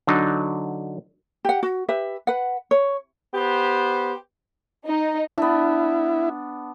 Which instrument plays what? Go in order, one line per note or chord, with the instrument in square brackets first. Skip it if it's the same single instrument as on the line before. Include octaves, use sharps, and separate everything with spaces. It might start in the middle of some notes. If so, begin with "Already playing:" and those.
[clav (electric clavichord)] D3 F#3 D4 D#4
[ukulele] G4 F#5
F#4
G4 B4 E5
B4 F#5
C#5
[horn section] B3 G4 C5
[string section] D#4
[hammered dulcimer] B3 D4 [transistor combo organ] E4